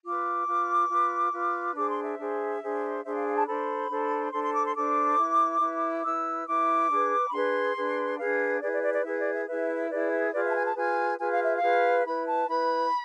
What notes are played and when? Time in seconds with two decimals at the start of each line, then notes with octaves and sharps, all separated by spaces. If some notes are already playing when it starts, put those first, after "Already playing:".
0.04 F4 B4 D6
0.47 F4 B4
0.89 F4 B4
1.32 F4 B4
1.75 D4 G#4 C5 D6
1.89 C6
2.04 E5
2.18 D4 G#4 C5
2.61 D4 G#4 C5
3.04 D4 G#4 C5 E5
3.15 F5
3.26 F5
3.37 A5
3.47 D4 A4 C5 B5
3.90 D4 A4 C5
4.32 D4 A4 C5 C6
4.44 C6
4.54 D6
4.65 C6
4.75 D4 A4 C5 D6
5.18 E4 B4
5.61 E4 B4
6.04 E4 B4 E6
6.47 E4 B4 D6
6.90 D4 G#4 B4
7.28 B5
7.33 D4 G#4 B4 C6
7.76 D4 G#4 B4
8.19 D4 G#4 B4 F5
8.61 E4 G#4 B4 D5
8.72 D5
8.83 D5
8.94 D5
9.04 E4 G#4 B4 E5
9.18 D5
9.33 E5
9.47 E4 G#4 B4 E5
9.90 E4 G#4 B4 D5
10.11 E5
10.33 F4 G#4 B4 D5
10.44 E5
10.49 A5
10.54 G#5
10.65 A5
10.76 F4 G#4 B4 G#5
11.18 F4 G#4 B4 G#5
11.31 F5
11.43 E5
11.55 F5
11.61 F4 G#4 B4
12.04 E4 B4 B5
12.26 A5
12.47 E4 B4 B5